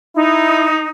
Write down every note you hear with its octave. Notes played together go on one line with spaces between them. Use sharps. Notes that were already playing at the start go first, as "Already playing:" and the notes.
D#4 E4